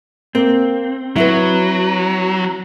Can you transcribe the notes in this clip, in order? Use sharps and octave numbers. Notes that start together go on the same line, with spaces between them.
A#3 C4
F#3 E4 F#4 B4